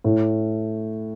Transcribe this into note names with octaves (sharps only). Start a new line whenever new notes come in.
A2